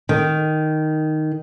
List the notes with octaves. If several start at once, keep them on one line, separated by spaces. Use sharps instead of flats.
D#3